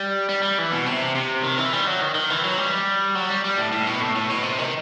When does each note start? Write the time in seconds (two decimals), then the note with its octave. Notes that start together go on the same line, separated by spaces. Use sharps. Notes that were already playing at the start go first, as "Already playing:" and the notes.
Already playing: G3
0.29 G3
0.43 G3
0.58 E3
0.72 B2
0.86 C3
1.15 C3
1.43 D#3
1.58 E3
1.73 G3
1.87 F#3
2.01 D#3
2.15 D#3
2.30 E3
2.44 F#3
2.58 G3
3.15 F#3
3.30 G3
3.44 G3
3.58 A2
3.72 A2
3.87 B2
4.00 A2
4.16 A2
4.30 B2
4.43 C3
4.59 D#3